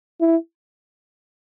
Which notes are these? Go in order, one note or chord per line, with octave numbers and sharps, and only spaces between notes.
E4